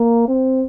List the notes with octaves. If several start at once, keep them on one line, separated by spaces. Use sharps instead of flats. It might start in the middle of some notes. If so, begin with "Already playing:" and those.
Already playing: A#3
C4